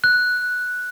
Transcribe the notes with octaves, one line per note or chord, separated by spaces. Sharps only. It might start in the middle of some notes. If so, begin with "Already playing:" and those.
F#6